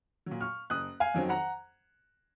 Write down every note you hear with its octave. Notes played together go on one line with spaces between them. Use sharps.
A#2 F#3
C#6 F6
F#1 D#6 F#6
F5 G#5
F2 D#3 F#3 C4
F#5 A#5